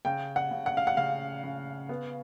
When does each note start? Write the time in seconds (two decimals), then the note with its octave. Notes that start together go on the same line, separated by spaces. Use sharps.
0.05 C#3 G5
0.36 F#5
0.51 C#3
0.66 F#5
0.77 F5
0.87 F#5
0.97 C#3 F5
1.44 C#3
1.89 B3